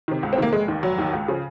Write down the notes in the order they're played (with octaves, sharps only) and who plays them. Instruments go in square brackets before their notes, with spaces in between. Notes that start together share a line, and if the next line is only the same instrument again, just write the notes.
[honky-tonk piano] C3 D#3
C#2
C4
C3 D#3 A#3
F1 G#3
D#2 D#3
F1 F#3
D#2 D#3
C#2
C#3 F3